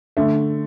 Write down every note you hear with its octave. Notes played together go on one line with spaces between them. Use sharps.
D3 A3